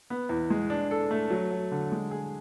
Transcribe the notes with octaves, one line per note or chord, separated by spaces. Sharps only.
B3
E2
G#3
D4
A4
A3
F#3
F#3
D3
G#3
G#4